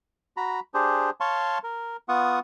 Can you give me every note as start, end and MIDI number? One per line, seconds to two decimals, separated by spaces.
0.37 0.60 66
0.37 0.60 82
0.37 0.60 83
0.74 1.10 62
0.74 1.10 67
0.74 1.10 68
0.74 1.10 72
1.20 1.58 73
1.20 1.58 77
1.20 1.58 81
1.20 1.58 84
1.20 1.58 85
1.64 1.97 70
2.09 2.39 59
2.09 2.39 65
2.09 2.39 78
2.09 2.39 85
2.09 2.39 87